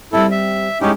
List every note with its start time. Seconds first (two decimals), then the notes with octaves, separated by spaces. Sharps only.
0.13 G3 C4 E4 A4
0.31 E5
0.81 G#3 C#4 D#4 E4 G4